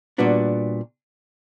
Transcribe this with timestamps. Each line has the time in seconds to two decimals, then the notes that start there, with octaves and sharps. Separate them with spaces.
0.18 A#2 G3 B3 D4 F#4